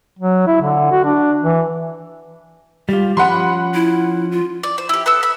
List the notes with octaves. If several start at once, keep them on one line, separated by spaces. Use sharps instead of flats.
F#3
E4
D3
F#4
D4
E3
G3 F4 G4
F3 C#4 F#5 B5 C6
E4
F4
D5
C5
E4 G4
B3 A4 E6
E5 B5